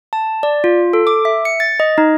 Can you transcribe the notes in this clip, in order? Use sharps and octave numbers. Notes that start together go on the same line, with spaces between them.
A5
D5
F4
A4
D6
E5
C#7
A6
D#5
D#4